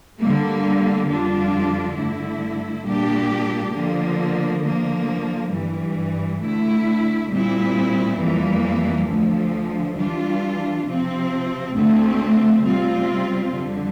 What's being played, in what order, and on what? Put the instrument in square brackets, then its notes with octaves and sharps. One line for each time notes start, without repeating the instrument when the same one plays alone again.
[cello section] D3 G3 A#3
F2 D3 G3 D4 F4
G2 D3 A3 E4
A#2 G3 D4 G4
D3 F3 A#3
D3 F3 A#3
G2 E3 G3
D2 D3 A3 E4
A#2 G3 C4 E4
F2 E3 G3 A#3
D2 D3 F3 A3
E3 G3 D4 F4
C3 F3 C4
D2 D3 A3 C4
C3 G3 C4 F4
F2 D3 G3